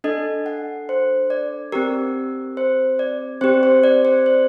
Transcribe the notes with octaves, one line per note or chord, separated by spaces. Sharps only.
D4 A4 D#5
F#5
C5
D5
C4 G4 A#4
C5
D5
C4 G4 C5
C5
D5
C5
C5